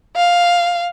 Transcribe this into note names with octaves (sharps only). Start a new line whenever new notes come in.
F5